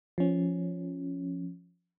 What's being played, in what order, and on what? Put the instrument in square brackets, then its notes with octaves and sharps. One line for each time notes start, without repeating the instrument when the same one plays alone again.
[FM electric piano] F3 C#4